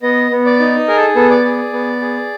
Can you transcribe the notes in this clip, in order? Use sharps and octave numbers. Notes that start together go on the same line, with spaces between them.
B3 D#5
B3
D5
D#4
G#4 A#4
A4
B3 A4
D5
G#4
B3
G#4